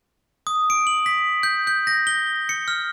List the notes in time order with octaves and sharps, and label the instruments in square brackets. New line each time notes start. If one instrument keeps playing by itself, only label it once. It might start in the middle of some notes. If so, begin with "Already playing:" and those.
[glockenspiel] D#6
D7
F#7
B6
G6
G6
A#6
G7
C#7
F6